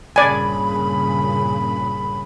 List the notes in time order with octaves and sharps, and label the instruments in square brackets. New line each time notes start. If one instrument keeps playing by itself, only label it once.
[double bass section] G2 A#2 C#3 [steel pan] D5 G#5 [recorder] B5